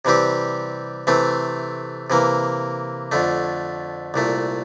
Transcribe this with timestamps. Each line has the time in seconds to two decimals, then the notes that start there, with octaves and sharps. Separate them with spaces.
0.05 C3 E3 G3 C4 G4
1.07 C3 E3 A3 C4
2.10 C3 E3 A#3
3.12 F2 D3 A3
4.14 C2 A#2 A3